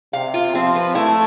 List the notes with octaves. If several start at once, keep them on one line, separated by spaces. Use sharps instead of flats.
C3 F5
F4
F3 C4
B4
A3 E4